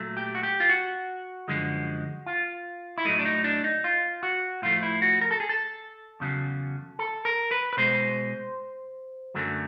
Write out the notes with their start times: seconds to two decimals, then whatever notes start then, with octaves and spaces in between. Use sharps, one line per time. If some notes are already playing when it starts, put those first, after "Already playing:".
Already playing: A#2 F#3 A3
0.17 G4
0.35 F#4
0.43 G4
0.60 F4
0.69 F#4
1.48 F#2 D3 F3 G#3
2.26 F4
2.98 E4
3.05 A2 F#3 A3 D#4
3.19 D4
3.25 D#4
3.44 D4
3.64 D#4
3.84 F4
4.23 F#4
4.62 A2 F3 A3 F4
4.83 E4
5.02 F#4
5.21 A#4
5.31 A4
5.40 G#4
5.49 A4
6.20 E2 C#3 F#3
6.99 A4
7.25 A#4
7.51 B4
7.73 B4
7.77 B2 G#3 C5
9.34 F#2 D3 F#3 A3